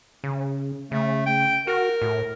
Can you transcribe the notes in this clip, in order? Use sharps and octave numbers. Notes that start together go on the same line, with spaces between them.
C#3
C#3 A3
G5
F#4 A#4
A2